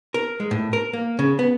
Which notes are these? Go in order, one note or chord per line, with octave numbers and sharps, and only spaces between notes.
A#4
G#3
A2
A#4
A#3
C#3
B3